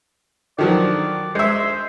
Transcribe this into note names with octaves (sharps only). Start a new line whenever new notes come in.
D#3 F3 F#3 D5
G#3 C5 E5